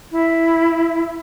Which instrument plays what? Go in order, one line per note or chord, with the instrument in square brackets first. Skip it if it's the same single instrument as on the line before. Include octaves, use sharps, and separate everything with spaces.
[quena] E4